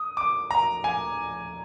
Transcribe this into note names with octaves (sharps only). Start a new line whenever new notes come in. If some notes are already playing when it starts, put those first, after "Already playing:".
Already playing: D#6
D6
A#5
G#5